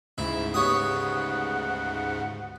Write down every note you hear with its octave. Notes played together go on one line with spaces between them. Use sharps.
D2 G#2 C#3 E4
B3 F#4 G4 C#5 F#5 C#6 D#6